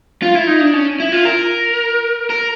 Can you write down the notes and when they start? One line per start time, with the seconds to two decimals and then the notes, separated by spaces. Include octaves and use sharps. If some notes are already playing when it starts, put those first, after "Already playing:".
0.22 F4
0.35 E4
0.47 D#4
0.61 D4
0.73 C#4
1.00 E4
1.12 F4
1.25 A#4
2.30 A#4